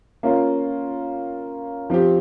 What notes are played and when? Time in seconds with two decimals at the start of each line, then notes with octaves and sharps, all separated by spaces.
0.23 A#3 C#4 F4
1.90 F3 C4 G4